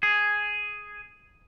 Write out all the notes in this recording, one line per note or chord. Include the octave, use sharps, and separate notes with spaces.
G#4